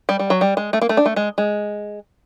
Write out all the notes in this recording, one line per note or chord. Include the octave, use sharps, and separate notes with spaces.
G3
G3
F#3
G3
G#3
A3
A#3
A3
D4
A3
G#3
G#3